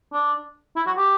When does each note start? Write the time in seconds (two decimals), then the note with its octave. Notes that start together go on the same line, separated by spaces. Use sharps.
0.13 D4
0.76 E4
0.87 F#4
0.97 G4